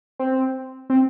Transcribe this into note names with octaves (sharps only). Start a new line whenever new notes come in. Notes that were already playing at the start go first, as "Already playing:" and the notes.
C4
C4